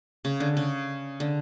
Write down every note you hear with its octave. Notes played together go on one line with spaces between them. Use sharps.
C#3
D3
C#3
D3